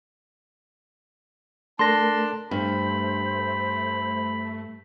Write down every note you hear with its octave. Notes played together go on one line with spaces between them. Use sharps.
A3 D4 A4 A#4 A5 C6 A#6
G2 A3 C5 B5